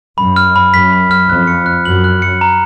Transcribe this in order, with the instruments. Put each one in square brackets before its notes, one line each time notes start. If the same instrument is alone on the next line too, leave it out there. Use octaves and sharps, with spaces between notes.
[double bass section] F#2 [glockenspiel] B5
[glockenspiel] F6
B5
[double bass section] F#2 [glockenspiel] B6
[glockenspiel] B5
F6
[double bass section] F2 [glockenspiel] F#6
[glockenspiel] C#7
F#6
[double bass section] F#2 [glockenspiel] F#7
[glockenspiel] F#6
C#7
A#5